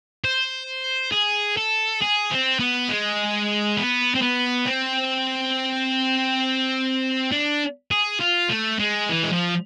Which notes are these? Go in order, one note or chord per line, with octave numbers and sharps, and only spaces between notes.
C5
G#4
A4
G#4
C4
B3
G#3
B3
C4
B3
C4
D4
G#4
F4
A3
G#3
E3
G#3
F3